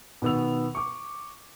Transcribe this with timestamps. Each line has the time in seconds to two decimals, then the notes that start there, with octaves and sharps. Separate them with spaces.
0.22 B2 D#3 B3 E6 F7
0.75 C#6 D6